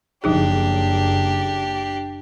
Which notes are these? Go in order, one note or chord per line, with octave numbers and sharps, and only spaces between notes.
F#1 F3 D4 D#4 G4 G#4